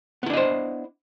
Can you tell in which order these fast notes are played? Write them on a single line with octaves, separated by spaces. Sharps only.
B3 E4 D4 D#5 C5